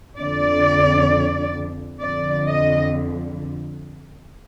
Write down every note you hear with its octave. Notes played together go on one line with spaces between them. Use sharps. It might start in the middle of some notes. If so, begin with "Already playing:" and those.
F2 D3 D5
F2 D3 D5
D#5